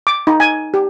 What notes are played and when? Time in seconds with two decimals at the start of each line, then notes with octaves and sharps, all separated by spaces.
0.07 D6
0.27 D#4
0.40 G#5
0.74 G4